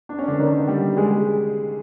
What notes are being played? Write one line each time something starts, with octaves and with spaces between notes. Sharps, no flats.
D4
C#4
D3 D4
D#3 D#4
G3 G4
G#3 G#4